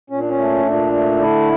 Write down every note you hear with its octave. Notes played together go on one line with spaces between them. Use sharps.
A#2 C#4
D4
C#4
A3
A#2 D4
A3
D3 E4